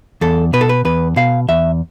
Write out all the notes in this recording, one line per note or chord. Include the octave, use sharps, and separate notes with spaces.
E2 A4
B2 B4
A4
B4
E2 B4
B2 F5
E2 E5